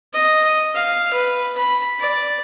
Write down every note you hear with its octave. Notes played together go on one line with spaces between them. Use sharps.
D#5
F5
B4
B5
D5